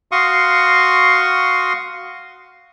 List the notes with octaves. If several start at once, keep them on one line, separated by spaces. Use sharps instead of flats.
F#4 F5 C6 C#6 D#6